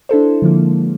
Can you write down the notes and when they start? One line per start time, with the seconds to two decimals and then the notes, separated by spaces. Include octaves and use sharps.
0.09 D4 E4 A4 C5
0.42 D3 F3 G#3 A#3